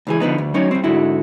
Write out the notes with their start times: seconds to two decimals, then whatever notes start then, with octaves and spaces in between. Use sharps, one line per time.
0.07 C#2 E3 G#4
0.20 D3 F3 B3 D#4
0.38 D2
0.54 F#3 C#4 D#4 C#5
0.71 G3 C4
0.84 G#2 D3 G#3 E4 F#4